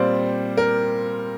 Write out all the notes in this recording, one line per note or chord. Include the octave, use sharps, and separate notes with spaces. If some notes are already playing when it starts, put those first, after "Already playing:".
Already playing: A#2 G3 C4 C5 D5
A#4